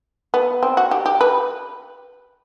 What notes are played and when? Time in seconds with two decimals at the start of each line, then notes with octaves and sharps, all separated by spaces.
0.34 B3
0.63 C4
0.77 F#4
0.91 G4
1.06 G4
1.21 B4